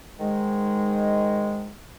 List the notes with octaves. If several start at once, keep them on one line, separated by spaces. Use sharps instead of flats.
G#2 D#3 G#3